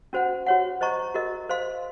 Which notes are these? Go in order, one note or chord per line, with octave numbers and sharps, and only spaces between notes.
C#4 F#4 C5 F#5
F#4 C#5 F#5
C5 D#5 A#5 C#6
F#4 A#4 D#5
C5 F5 C6